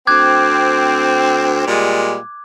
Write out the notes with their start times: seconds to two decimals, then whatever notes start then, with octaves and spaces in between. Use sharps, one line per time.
0.07 D2 C4 D6 F#6 G#6
1.67 A#2 G3 G#3